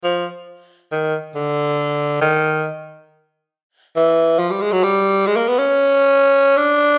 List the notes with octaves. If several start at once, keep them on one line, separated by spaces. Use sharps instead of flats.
F3
D#3
D3
D#3
E3
F3
G3
G#3
F#3
G3
G#3
A#3
B3
C#4
D4